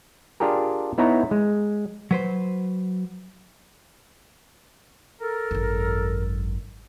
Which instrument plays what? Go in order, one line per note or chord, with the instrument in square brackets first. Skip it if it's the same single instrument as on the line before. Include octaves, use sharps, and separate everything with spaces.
[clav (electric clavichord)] D4 F4 G4 G#4 A#4
B3 D#4 E4 B4 C#5 A#5
G#3
[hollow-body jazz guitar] F#3 B4 C5
[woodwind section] A4 A#4
[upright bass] G#1 F#2